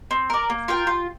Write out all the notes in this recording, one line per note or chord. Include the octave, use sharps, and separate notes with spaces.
C4
A#4 D5
A#3
F4 A#4 G5
F4